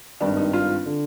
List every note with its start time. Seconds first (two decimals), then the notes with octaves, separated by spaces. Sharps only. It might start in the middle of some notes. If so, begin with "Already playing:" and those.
0.20 G#1 G2 D#3 G3 D4
0.37 D#4
0.53 F4
0.86 D3